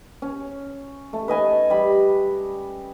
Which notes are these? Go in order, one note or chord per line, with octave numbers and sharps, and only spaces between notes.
C#4
A3
B4 D#5 G#5 A5
G3 B5